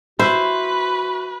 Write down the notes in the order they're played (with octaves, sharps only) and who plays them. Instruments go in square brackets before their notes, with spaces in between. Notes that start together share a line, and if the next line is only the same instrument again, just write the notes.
[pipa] E4 [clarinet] F#4 [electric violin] B4 [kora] C5